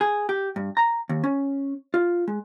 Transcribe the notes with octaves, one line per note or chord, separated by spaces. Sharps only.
G#4
G4
G2
A#5
D#2
C#4
F4
G#3